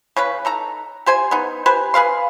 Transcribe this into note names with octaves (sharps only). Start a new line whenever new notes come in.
C#3 C#4 B4
D#4 A4 A#5
G4 C5 G#5
B3 D#4
G4 B4 C5 G#5
G#4 B4 F5 C6